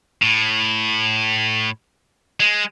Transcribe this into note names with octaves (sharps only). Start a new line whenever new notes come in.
A2
G#3